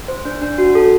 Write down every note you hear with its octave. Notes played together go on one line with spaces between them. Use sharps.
C5
D4
D4
F#4
A4